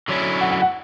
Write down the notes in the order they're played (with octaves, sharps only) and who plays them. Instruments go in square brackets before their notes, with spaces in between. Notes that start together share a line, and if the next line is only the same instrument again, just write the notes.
[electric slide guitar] D3 F#3 C#4 E4
[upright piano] F#5
F#5
F#5